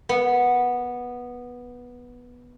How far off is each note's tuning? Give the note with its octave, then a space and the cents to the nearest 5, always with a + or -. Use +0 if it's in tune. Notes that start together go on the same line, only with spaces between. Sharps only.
B3 -10